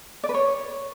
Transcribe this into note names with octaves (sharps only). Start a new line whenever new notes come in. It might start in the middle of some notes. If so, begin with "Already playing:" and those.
D5
B4
C#5